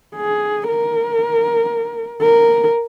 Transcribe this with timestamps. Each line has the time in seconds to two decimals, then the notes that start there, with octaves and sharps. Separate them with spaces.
0.16 G#4
0.68 A#4
2.22 A#4